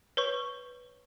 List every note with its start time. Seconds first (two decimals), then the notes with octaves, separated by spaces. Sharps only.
0.17 B4 C#5 C#6